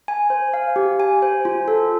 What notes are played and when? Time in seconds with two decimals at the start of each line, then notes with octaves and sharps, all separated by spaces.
0.08 G#5
0.30 C5
0.54 F5
0.76 G4
1.00 G#5
1.22 C5
1.45 F4
1.68 A4